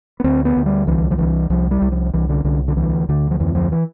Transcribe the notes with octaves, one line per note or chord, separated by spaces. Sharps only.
B3
D2 C4
B3
D2
G3
C2 E3
F3
C2 E3
C2 F3
G3
C2
F3
C2 E3
D3
C2 D3
D3
D2 E3
D2 D3
F3
F2 E3
F3
E3